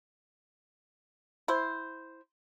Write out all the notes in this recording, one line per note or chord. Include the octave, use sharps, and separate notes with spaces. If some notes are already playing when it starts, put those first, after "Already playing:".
E4 C5